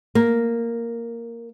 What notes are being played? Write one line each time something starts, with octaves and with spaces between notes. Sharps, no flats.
A#3